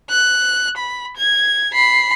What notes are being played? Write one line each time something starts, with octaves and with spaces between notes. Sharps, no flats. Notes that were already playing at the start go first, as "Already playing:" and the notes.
F#6
B5
G#6
B5 C7